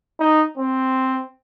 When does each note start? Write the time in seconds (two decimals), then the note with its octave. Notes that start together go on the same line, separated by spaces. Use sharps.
0.20 D#4
0.58 C4